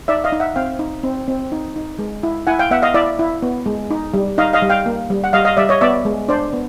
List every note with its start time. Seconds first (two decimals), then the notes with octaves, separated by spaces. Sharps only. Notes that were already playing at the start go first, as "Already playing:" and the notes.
0.08 D#4 D5 E5
0.24 D#5 F5
0.32 D#4
0.40 E5 F#5
0.56 C4 F5 G5
0.79 D#4
1.03 C4
1.28 C4
1.52 D#4
1.76 D#4
1.99 G#3
2.23 E4
2.47 E4 F#5 G#5
2.59 F5 G5
2.71 B3 E5 F#5
2.82 D#5 F5
2.94 E4 D5 E5
3.19 E4
3.42 B3
3.66 G#3
3.90 D#4
4.14 G3
4.38 D#4 D#5 F5
4.53 D#5 F5
4.62 G3
4.70 F5 G5
4.86 A#3
5.10 G3
5.24 F#5
5.33 G3 D#5 F5
5.45 D#5 F5
5.57 G3 D5 E5
5.69 C#5 D#5
5.81 B3 D5 E5
6.05 G#3
6.28 D4 C5 D5
6.53 B3